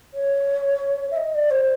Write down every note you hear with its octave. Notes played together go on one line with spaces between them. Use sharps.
C#5
E5
D#5
D5
C5